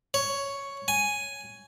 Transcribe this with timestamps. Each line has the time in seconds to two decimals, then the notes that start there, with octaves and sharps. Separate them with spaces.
0.14 C#5
0.88 G#5